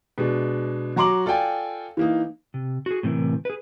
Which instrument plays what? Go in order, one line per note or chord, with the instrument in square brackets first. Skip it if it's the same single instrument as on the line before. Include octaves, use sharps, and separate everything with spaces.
[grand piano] B2 G#3 D4
F#3 F#4 A#5 C6 D6 F#7
F4 A4 D5 G5 G#5
E3 A#3 D#4
[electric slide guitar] C3
F#4 G#4
A2 C3 D#3 E3 A#4
G#4 B4